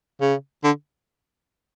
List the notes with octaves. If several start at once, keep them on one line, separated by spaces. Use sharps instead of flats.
C#3
D3